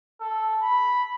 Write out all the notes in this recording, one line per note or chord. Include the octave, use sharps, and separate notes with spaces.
A4
B5